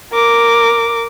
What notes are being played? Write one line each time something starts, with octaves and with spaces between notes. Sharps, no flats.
A#4 D6